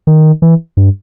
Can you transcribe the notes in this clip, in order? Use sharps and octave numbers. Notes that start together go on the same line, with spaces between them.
D#3
E3
G2